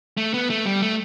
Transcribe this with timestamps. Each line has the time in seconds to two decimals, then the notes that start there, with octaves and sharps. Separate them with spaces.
0.17 A3
0.34 B3
0.50 A3
0.66 G3
0.82 A3